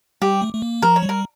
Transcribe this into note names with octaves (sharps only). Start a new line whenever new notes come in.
G3 G4
A3
A3
A#3
F3 A#4
C#5
G3
A#4